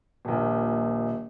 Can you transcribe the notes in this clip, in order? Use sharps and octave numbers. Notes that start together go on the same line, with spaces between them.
D#1 A#1